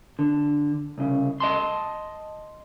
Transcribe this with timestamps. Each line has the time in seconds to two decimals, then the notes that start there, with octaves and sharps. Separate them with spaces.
0.19 D3
0.98 C2 C#3
1.40 D#5 A5 C6